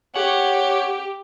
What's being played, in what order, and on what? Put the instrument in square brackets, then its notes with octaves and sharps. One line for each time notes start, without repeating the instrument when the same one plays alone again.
[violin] G4 [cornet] C#5 [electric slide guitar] F#5